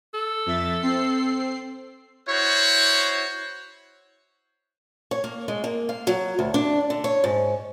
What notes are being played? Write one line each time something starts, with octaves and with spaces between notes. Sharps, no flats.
A4
F2 E5 A6
C4 C7
E4 F#4 C5 C#5
C#5
A#3
G#3
A#3
F5
F#3
D2
D4
D3
C#5
G#2